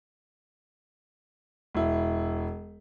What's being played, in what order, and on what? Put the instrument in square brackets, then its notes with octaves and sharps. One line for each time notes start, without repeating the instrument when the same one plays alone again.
[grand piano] E1 E4